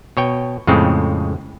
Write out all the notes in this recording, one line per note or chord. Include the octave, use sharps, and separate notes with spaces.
B2 C#5 G5
F2 A2 C#3 G#3 C4